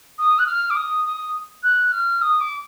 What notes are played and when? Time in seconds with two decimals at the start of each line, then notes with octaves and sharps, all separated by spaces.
0.18 D#6
0.39 F#6
0.46 F6
0.70 D6
0.76 D#6
1.05 D#6
1.63 F#6
1.92 F6
2.22 D#6
2.41 D6